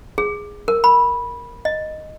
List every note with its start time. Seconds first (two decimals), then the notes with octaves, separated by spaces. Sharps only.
0.18 G#4
0.68 A#4
0.84 B5
1.65 D#5